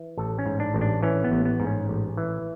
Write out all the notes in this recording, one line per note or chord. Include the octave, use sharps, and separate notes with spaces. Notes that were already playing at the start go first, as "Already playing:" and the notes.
Already playing: E3
A1 A4
C#4
G#2
D4
A1
D4
E3 C#4
B3
A1
B3
G#2
C#4
A1
E3